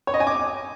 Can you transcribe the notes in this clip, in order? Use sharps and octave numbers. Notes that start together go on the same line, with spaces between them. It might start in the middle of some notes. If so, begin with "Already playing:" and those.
C#5
D#5
G#5
D6